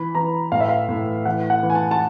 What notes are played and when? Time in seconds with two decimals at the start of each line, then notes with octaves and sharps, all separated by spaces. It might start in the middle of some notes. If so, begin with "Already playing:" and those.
Already playing: E3 B5
0.15 E3 A#5
0.52 A2 F5
0.60 E5
0.68 F5
0.89 A2
1.25 E3 F#5
1.50 F#5
1.63 E3
1.70 G#5
1.75 A5
1.91 A5